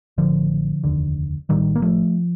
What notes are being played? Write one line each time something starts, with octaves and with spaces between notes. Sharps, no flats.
A1 A2 D3 F3
F1 D#2 D3
A1 A2 D#3 G3
A#3
F3 A3